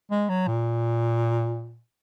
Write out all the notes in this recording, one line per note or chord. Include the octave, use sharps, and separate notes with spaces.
G#3
F#3
A#2